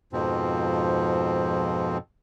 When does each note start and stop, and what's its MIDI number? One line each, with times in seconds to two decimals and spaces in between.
0.13 1.98 41
0.13 1.98 44
0.13 1.98 47
0.13 1.98 53
0.13 1.98 60